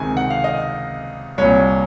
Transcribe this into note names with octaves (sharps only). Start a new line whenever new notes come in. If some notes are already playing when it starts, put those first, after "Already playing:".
Already playing: C#2 C3 D#3 G#5
F#5
F5
D#5
C2 A#2 C#5